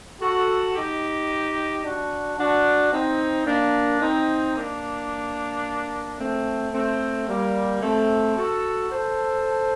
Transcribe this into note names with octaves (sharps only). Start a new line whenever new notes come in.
F#4 A4
D#4 G4
D4 F#4
D4 F#4
C4 D#4
A#3 D4
C4 D#4
A#3 D4
A3 C4
A3 C4
G3 A#3
A3 C4
F#4 A4
A4 C5